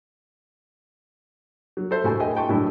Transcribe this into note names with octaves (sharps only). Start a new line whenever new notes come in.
F#3
A4 C5 E5
A2 E4 F#4 A4 G#5
G#4 A#4 D#5 E5 G5 G#5
G5 A5 C6 C#6
A2 F#3 D4 E4